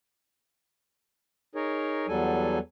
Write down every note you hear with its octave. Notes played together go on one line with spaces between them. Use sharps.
D#4 G#4 A#4 C#5
E2 F#3 G3 A4 G#5